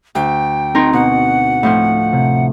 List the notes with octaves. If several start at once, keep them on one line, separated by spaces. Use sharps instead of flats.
D2 G5
C4 D#4 A#4 C6
B2 F#5
A2 F3 F4
C3